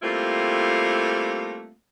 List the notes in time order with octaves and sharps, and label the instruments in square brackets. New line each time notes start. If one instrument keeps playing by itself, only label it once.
[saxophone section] G3 A3 A#3 C4 E4 F4